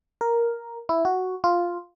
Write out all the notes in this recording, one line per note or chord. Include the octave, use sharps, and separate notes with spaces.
A#4
E4
F#4
F4